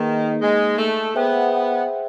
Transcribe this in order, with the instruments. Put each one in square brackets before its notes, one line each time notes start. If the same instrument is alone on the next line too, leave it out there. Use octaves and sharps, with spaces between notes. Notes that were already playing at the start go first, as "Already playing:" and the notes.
Already playing: [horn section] D#3 [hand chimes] A#3 D#4 G#4 B4
[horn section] G#3
A3
[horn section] B3 [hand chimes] G#4 C5 E5 G5